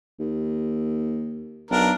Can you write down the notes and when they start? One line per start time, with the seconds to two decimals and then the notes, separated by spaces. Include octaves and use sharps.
0.20 D#2
1.71 B1 D4 A#4